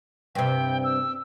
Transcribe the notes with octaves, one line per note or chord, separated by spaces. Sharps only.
G2 C3 G5
E6